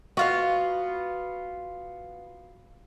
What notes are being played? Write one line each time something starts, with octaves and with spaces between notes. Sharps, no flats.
B3 F4 F#4 F5